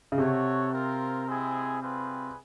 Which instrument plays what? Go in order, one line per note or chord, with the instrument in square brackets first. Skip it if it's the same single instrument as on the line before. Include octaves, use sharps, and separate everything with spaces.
[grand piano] C#3
[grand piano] C3 [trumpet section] F#4 A4 C#5 F#5
[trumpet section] C4 F4 A#4
G#3 C4 E4 G#4
G3 C4 F4 G#4 B4